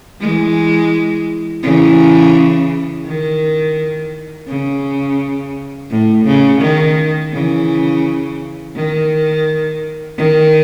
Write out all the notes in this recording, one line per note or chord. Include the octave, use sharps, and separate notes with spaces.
E3 G#3
C#3 E3
D#3
C#3
A2
C#3
D#3
C#3 E3
D#3
D#3